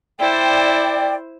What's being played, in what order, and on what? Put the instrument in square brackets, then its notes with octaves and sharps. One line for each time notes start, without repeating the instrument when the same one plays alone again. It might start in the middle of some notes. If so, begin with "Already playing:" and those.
[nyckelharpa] E4 C5 [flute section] D5 G5